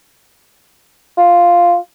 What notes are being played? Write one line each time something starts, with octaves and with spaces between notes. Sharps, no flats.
F4